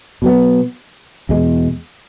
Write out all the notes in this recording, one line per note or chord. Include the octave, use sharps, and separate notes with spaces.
B2 F#3 B3
E2 B2 G#3